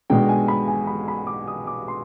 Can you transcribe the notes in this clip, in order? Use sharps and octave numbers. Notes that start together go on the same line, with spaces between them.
B1 B2 G#3 D4 G5
G#5
B5
G#5
B5
B5
D6
D#6
D6
C6